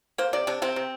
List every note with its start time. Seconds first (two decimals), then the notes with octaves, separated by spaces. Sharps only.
0.18 A#3 C5
0.33 C3 D5
0.47 C3 D4
0.62 C3 C4
0.76 C3